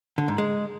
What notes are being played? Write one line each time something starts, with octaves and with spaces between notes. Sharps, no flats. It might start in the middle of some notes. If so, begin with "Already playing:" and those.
D3
G#2
G#3